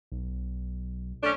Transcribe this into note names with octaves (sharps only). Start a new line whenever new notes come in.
B1
A3 C#4 D4